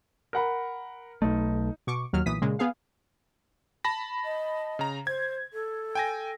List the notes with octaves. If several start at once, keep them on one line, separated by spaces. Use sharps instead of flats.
A#4 F#5 B5
B1 A3 D#4
B2 C#6 D6
D#2 F#3 F6
B1 A#2 E3 D#6 B6
A#2 C#3 G#3
B3 G#4 F5
A5 B5 A#6
D#5
C#3 A#5
C5 G#6
A4
G5 G#5 A#6